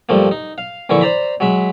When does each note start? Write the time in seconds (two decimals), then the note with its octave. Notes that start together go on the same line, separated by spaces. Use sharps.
0.09 G2 F3 A3 A#3
0.31 D#4
0.58 F5
0.89 A#1 D3 E3 E4 C#6 D6
1.01 C5 D5 A#5 B5
1.40 F#3 G#3 E5 B5